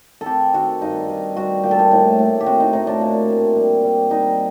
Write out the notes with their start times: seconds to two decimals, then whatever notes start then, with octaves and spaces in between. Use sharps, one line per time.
0.21 A4
0.26 C4 G4
0.54 D#3 F#4
0.82 G2 D#4
1.09 G2
1.36 G3 F#4
1.63 A#2 G4
1.71 A4
1.79 G4
1.91 A2
2.18 A2
2.41 G4
2.46 C4 F#4
2.60 D#4
2.73 A2 D#4
2.87 D4
3.01 A#2
3.29 C4
3.56 G3
3.83 G3
4.10 G3 D#4